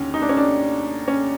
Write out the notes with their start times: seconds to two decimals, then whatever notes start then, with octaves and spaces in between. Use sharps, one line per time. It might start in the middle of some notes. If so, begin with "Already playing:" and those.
Already playing: D#2 D3 C#4
0.14 D#4
0.22 D4
0.29 C#4
0.37 D4
1.08 C#4